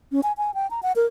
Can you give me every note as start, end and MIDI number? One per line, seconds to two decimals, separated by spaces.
0.12 0.20 61
0.23 0.32 80
0.37 0.54 80
0.54 0.69 79
0.71 0.80 82
0.83 0.92 78
0.96 1.06 70